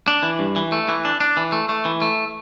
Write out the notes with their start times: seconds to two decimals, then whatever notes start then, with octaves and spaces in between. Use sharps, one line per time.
0.08 D4
0.23 E3
0.39 G2
0.56 E3
0.72 A3
0.89 E3
1.05 D4
1.20 D4
1.37 E3
1.52 A3
1.69 A3
1.85 E3
2.02 A3